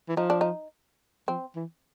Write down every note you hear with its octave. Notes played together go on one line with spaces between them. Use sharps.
E3
F3 D#4
D4
D#4
F3 C4
E3